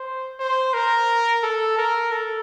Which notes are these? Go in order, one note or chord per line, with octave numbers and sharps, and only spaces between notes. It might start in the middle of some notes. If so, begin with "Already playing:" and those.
Already playing: C5
C5
A#4
A4
A#4
A4